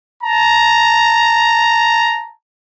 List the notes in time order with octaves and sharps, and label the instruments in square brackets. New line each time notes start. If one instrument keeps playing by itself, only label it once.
[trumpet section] A5 A#5